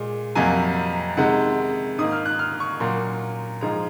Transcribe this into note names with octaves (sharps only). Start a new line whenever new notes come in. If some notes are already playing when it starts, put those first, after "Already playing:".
Already playing: A#2 G#3
F2 C3 F#3 A#3 G#5
C3 D#3 G#3 F#5
G#2 D#3 A#3 D#6
F6
F#6
F6
C#6
A#2 F#3 A#3 C6
G#2 F3 G#3 A#5